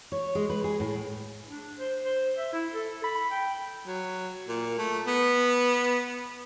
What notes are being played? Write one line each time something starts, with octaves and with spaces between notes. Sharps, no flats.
C#5
G#3
B4
G#4
A2
D4
C5
C5
E5
E4
A4
B5
G5
F#3
A#2
A3
B3